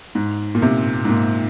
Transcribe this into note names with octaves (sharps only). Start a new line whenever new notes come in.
G#2
A#2
C3
G#2
A#2